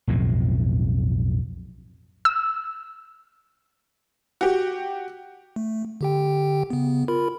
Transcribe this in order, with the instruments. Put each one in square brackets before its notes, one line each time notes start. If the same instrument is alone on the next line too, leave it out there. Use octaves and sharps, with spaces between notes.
[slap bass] B1 F2 A2 C3
[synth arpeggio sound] E6
[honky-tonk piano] F#4 G4
[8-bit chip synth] A3
D3 G4 G5
C#3 B3
F4 A#4 B5